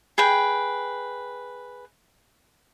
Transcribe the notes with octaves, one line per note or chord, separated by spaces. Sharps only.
G#4 B4 G5